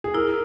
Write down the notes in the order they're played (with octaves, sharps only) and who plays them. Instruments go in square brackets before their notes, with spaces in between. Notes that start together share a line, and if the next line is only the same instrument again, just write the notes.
[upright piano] G#4
[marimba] E4 [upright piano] A#4